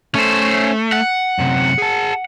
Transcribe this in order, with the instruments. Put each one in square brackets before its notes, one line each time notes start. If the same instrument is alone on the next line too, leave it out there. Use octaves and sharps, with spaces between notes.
[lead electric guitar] A3 [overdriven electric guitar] C#4 C5
[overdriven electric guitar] F#5
[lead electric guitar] F#2 C3
G#4 A5